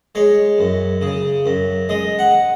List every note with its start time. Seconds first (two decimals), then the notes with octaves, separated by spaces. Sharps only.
0.15 G#3 C#5
0.58 F#2
1.01 C#3
1.46 F#2
1.89 G#3 D#5
2.19 F#5